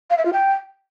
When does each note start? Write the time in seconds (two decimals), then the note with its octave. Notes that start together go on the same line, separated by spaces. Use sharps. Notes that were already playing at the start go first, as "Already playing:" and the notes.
0.10 F5
0.18 E5
0.25 F4
0.33 G5